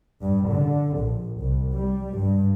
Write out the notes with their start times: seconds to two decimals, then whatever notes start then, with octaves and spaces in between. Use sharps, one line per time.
0.22 G2
0.51 D3
0.97 A#1
1.40 C2
1.74 G3
2.19 G2